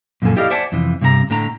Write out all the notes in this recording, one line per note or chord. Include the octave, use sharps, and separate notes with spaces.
F#2 A#2 D3 F3 A4 G#5
E4 G4 A4 D5 D#5 F5
C5 D5 E5 F#5 G#5 A5
F2 C3 E3
G2 C3 C4 F#4 A#5
A2 D3 G5 A#5